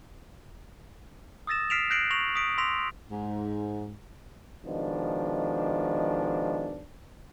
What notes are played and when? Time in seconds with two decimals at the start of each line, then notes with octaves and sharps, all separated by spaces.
1.47 D#6 E6 A6 A#6 E7
1.70 F6 B6 C7 D7 E7 F7
1.90 F#6 G6 A#6 C7 D7 F#7
2.11 C#6 A#6 F7 F#7
2.35 D#6 B6 D7
2.58 C6 E6 A#6 B6 F7
3.10 G#2
4.65 B2 D#3 F3 G#3 D4